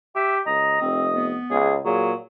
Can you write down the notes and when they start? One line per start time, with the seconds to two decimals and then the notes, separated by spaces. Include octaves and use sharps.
0.15 G4 E5
0.47 C#2 D#5 A#5
0.81 F1 C4
1.13 B3
1.51 C#2 G#4
1.85 A#2 F#3 G#4